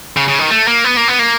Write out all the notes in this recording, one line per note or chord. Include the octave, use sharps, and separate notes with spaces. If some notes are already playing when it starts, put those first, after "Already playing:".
C#3
C#3
D#3
A3
A#3
B3
A#3
B3
A#3